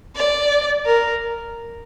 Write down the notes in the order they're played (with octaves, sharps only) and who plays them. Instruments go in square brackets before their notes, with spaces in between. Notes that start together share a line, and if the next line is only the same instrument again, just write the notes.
[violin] D5
A#4